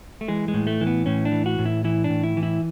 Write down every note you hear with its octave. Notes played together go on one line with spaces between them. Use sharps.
A3
E3 G#3
G#3
A2
A3
E3
B3
A2 C#4
D4
E3
F#4
A2
E4
E3 E4
D4
A2
E4
E3
E4